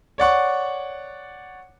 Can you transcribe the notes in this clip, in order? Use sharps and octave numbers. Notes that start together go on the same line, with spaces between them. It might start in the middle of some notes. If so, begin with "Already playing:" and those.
C#5 D5 F#5 C#6